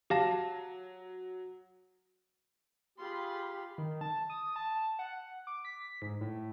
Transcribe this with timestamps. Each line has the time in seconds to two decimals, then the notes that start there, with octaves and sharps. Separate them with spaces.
0.10 F#3 G4 F5 A5 A#6
2.98 F4 G4 G#4 B5 C6
3.78 D#3
4.01 A5
4.30 D#6
4.56 A5
4.99 F#5
5.47 D6
5.65 B6
6.02 G#2
6.21 A2